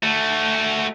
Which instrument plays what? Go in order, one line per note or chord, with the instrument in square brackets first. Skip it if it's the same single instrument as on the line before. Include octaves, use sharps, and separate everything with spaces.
[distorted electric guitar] A3 F#4